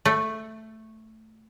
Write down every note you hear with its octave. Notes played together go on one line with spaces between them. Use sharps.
A3